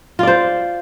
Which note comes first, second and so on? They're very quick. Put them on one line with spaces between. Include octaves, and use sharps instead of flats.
F4 D5 C5